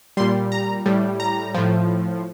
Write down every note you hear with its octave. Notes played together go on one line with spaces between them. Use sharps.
A#2 G3 C6
A#5
A2 G3
A#5
A2 F3